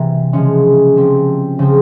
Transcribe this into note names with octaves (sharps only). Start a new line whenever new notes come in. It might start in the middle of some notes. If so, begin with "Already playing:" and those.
Already playing: C3 E3 A#3
C#3 F3 G#3 C#4
F3 C4 G4
C#3 F3 C4